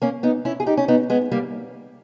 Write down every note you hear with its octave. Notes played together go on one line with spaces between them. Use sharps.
A#3 C#4
B3 D#4
C#4 E4
G#4
D#4 G4
C#4
B3 D#4
G#3 B3
G3 A#3